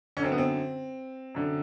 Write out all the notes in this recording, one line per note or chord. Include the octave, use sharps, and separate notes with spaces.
D3 C#4
F#2 C4
B3
C4
F#2 D3